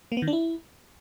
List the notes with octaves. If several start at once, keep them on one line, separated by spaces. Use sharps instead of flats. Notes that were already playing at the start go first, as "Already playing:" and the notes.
A#3
B3
D#3
D4
E4